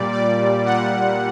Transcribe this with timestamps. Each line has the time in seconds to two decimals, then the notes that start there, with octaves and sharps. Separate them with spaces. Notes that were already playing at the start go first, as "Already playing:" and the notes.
Already playing: A#2 G3 D5
0.12 D5
0.65 A#2 G3 F#5